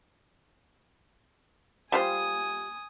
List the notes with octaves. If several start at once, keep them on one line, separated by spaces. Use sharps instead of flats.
G3 F4 C5 G#5 D#6